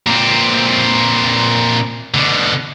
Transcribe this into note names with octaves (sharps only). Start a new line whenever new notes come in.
A#2 C4
B2 D3